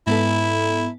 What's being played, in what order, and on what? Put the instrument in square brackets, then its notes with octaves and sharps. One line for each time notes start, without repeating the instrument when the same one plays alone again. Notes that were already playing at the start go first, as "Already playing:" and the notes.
[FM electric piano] G#2 B3 A4 [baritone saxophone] E4